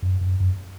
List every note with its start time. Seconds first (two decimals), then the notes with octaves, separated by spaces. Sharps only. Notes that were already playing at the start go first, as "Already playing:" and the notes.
0.02 F#2
0.21 F#2
0.40 F#2